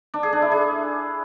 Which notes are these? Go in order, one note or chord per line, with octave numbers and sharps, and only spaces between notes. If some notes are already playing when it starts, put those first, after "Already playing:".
D4
G#4
D4
E4
G#4